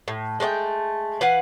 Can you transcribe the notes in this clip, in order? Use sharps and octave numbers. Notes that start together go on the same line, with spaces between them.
A2
G#3 A3 D5 G5
E3 B4 F5 F#5